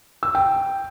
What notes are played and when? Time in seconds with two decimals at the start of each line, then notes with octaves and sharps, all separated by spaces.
0.23 E6
0.35 G5